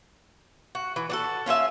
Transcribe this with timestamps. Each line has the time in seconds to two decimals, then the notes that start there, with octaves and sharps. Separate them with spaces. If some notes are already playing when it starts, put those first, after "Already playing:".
0.75 F#4
0.96 E3
1.10 D4 F#4 A4
1.46 C#4 F4 C#5 E5